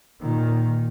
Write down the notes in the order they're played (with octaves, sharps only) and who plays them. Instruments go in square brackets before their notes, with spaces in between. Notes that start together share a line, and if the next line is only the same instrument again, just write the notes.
[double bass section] A#2 D#3